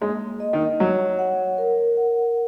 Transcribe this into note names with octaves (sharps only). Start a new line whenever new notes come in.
G#3 A#3
D#5
D#3
F#3 C#5
F#5
A#4
F#5